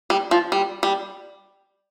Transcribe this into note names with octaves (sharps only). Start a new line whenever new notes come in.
G3
F3
G3
G3